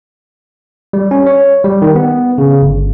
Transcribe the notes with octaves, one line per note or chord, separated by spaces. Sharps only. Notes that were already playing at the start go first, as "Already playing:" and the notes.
G3
C#4
C#5
G3
D#3
B3
C#3
G1